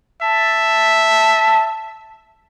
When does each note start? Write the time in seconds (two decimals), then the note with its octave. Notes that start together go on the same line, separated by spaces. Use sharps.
0.22 E5 A5